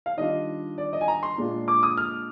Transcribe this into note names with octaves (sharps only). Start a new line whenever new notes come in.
F5
D#3 G3 D4 F4 D#5
D5
D#5
G#5
A#5
C6
A#2 G#3 D4 F4
D6
D#6
F6